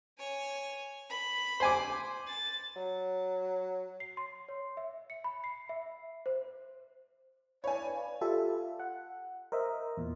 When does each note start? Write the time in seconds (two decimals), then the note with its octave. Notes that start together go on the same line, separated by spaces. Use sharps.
0.19 C#5 G#5
1.10 B5
1.60 C5 G#5 D6
2.28 A6
2.76 F#3
4.00 C7
4.17 C6
4.49 C#5
4.77 E5
5.10 C#7
5.24 B5
5.44 C7
5.69 E5
6.26 C5
7.64 B4 C#5 D5 F5 G#5 B5
8.21 F4 G4 A4 E5
8.80 F#5
9.52 A#4 C5 D#5 E5
9.97 E2 A#2